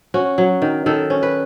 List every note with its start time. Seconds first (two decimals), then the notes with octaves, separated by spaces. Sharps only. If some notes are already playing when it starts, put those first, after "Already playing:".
0.14 C#4 F#4
0.38 F#3
0.62 D#3
0.86 D#3 A4
1.10 C#4
1.23 B4